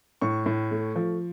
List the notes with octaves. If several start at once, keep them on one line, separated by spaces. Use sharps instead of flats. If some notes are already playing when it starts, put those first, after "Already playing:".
A2 C#6
A2
A3
F3